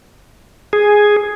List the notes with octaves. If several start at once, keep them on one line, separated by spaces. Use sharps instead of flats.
G#4